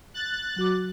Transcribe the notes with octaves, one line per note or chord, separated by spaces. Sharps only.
F#6 A6
F#3 F#4 D6